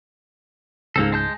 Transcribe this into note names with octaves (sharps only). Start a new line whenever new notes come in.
C#2 G#2 A#3 C4 A4
G#3 A5 G6